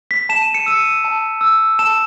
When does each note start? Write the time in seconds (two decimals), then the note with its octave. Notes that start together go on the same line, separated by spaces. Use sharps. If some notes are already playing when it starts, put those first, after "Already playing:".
0.11 B6
0.29 A5 E7
0.42 D#7
0.54 C#7
0.66 E6 D#7
1.04 A5
1.41 E6
1.79 A5 E7